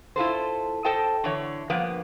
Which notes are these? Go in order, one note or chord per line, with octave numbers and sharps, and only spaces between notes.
E4 F4 A4 C5
A4 C5 D#5 G5 A5
D3 E3 C#5
G2 F3 A#3 B3